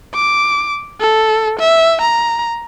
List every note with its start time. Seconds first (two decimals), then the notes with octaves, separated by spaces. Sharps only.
0.14 D6
1.00 A4
1.60 E5
2.02 A#5